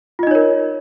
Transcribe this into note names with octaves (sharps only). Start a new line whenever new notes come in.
D#4 F4 A#4 C#5 D#5